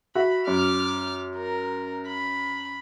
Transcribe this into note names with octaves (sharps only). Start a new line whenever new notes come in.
F#4 E5 B5
F#2 D6 F6
A#4
B5